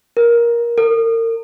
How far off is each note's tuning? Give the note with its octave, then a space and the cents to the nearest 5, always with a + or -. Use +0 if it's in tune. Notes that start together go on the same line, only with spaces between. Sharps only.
A#4 +10
A#4 -35